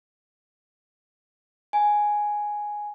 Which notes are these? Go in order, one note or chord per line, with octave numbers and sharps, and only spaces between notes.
G#5